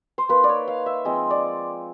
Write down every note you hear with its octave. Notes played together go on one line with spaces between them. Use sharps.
C5
A#3 D#4 B4
D5
C#5
F5
E5
F3 G#3 C4 D#5
D5